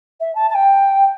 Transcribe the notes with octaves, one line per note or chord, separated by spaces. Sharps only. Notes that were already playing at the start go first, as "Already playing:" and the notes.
E5
A5
A5
G5